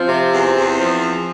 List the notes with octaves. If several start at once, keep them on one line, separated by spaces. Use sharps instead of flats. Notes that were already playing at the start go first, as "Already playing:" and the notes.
Already playing: F3 C4
C3
E2
E2
F3